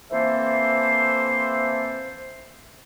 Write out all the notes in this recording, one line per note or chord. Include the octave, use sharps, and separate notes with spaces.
E3 A3 A#3 C4 A4 C5